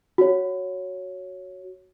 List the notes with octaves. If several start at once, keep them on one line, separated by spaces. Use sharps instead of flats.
F#4 C#5